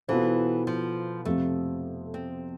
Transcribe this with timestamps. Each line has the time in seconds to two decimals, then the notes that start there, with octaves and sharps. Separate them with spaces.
0.08 B2 E3 B3 F4 A4 C5
0.67 F3
1.25 F2 C3 F3 A3
2.14 C4